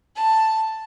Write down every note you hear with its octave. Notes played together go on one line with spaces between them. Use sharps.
A5